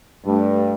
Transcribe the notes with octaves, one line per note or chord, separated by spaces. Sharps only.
G2 A3